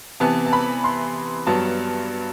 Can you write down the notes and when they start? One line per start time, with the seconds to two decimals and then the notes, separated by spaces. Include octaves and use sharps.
0.20 C3 E3 B3 A5
0.46 A5
0.53 B5
0.84 C6
1.47 G2 F#3 B3 A5